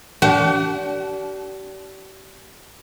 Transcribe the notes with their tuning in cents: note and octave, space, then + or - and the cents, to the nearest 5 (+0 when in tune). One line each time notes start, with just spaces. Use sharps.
D4 -30 G4 -35 F#5 +30